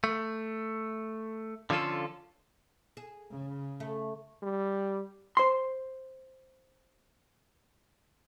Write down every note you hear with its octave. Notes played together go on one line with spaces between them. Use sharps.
A3
D3 F3 C#4 F4 A4
G#4
C#3
A3
G3
C5 C6